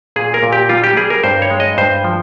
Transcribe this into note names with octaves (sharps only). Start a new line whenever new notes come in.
A#2 G#4
A#4
A#2
G4
G3 F4
G4
G3 G#4
A#4
G2 C5
C#5
G#3
D#5
G2 C5
F3